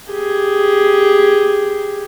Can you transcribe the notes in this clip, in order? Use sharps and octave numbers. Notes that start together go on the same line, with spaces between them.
G4 G#4